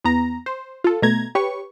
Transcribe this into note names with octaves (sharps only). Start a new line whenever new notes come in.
E2 B3 A#5
C5
F4 A4
B2 A3 A#5 G#6
G4 B4 C#5 C#6